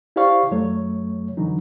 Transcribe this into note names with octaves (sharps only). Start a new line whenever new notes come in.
E4 G4 C5 D5 F5 C#6
F#2 F#3 A3 C#5
F2 D3 E3 F#3 D4 D#4